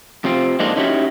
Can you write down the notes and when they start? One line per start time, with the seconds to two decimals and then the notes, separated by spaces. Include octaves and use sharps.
0.24 F2 C3 F3 C4
0.59 F3 G#3 A#3 D4 D#4 F4
0.76 C#4 D#4 E4 F#4 G4